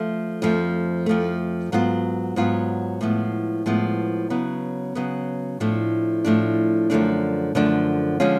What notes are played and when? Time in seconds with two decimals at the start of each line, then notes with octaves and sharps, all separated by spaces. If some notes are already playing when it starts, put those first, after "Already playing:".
Already playing: F3 A3 F4
0.42 F2 F3 A3
1.06 F2 F3 A3
1.72 G#2 F#3 B3 F4
2.36 G#2 F#3 B3 F4
3.01 A2 F3 G#3 B3
3.66 A2 F3 G#3 B3
4.30 C#3 F#3 B3
4.95 C#3 F#3 B3
5.60 A2 F3 A3 D4
6.24 A2 F3 A3 D4
6.90 F#2 D3 F3 A3 D4
7.55 F#2 D3 F3 A3 D4
8.20 D3 F3 G#3 C#4 F4